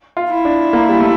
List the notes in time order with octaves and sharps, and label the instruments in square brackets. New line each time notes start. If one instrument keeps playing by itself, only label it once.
[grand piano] F4
[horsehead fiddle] E4
[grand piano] D4
A#3
G3
A3